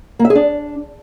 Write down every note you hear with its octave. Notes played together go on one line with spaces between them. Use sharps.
A#3
E5
G#4
D4